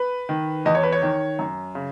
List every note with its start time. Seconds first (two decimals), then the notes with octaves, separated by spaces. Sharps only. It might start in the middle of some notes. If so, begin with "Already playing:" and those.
Already playing: B4
0.29 D#3
0.66 E2 D#5
0.75 C#5
0.83 B4
0.92 C#5
1.02 D#3
1.39 F#2
1.75 C#3